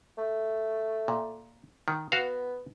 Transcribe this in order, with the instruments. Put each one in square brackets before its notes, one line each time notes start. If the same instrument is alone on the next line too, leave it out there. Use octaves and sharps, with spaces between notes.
[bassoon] A3
[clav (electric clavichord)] A#2
D#3
[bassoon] B3 [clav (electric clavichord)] F#4 F5